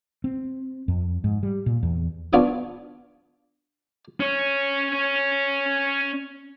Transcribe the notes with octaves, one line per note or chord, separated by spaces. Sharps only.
C4
F2
G#2
G3
A#2
E2
B3 D4 F4 C#5 D6 D#6
C#4 C#5